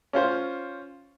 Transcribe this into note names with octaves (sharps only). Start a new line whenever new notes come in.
C#4 F4 C5